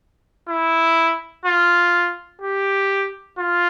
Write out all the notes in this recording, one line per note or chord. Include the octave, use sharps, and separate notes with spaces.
E4
F4
G4
F4